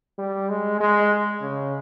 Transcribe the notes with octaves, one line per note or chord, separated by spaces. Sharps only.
G3
G#3
G#3
C#3